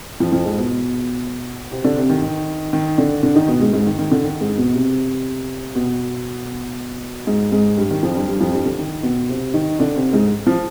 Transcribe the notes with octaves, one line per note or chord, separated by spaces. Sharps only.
F2 F3
F2 F3
G#2 G#3
B2 B3
C3 C4
D3 D4
C3 C4
D#3
D#3
D#3
D3 D4
D3 D4
D#3 D#4
B2 B3
G#2 G#3
G#2 G#3
D#3
D#3
D3
D#3
G#2 G#3
B2 B3
C3 C4
B2 B3
G#2 G#3
G#2 G#3
G2 G3
D#3
F2 F3
G2 G3
G2 G3
F2 F3
G2 G3
D3
D#3
B2 B3
C3 C4
D#3 D#4
D3 D4
C3 C4
G#2 G#3
F3